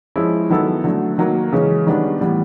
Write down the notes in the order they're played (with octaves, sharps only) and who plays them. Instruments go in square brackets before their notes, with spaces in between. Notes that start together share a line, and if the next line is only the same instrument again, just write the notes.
[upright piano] F3 G#3 C#4 E4
D#3 F#3 B3 E4 A4
D3 F#3 A3
D#3 F#3 A#3
C#3 E3 G#3 C#4
D#3 G3 B3 D4
A2 E3 G3 B3